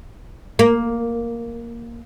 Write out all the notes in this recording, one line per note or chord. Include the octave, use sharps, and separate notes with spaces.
A#3